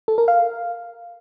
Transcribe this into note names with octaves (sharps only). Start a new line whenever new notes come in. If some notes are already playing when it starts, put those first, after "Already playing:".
A4
A#4
F5